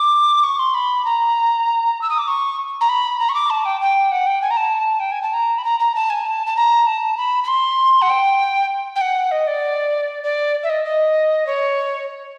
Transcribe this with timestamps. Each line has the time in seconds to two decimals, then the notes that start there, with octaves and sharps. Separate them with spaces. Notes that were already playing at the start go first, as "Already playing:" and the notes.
Already playing: D6
0.44 C#6
0.59 C6
0.74 B5
1.05 A#5
2.02 E6
2.10 D#6
2.19 D6
2.28 C#6
2.81 A#5
2.89 B5
3.19 A#5
3.29 C#6
3.34 D6
3.50 A5
3.65 G5
3.81 G5
4.12 F#5
4.27 G5
4.42 G#5
4.51 A#5
4.57 A5
5.00 G5
5.12 G#5
5.22 A5
5.33 A#5
5.58 B5
5.64 A#5
5.80 A#5
5.95 A5
6.10 G#5
6.26 A5
6.47 A5
6.57 A#5
6.87 A5
7.17 B5
7.44 B5
7.48 C6
8.02 F#5
8.10 G5
8.96 G5
9.01 F#5
9.31 D#5
9.47 D5
10.23 D5
10.63 E5
10.70 D#5
10.85 D#5
11.46 C#5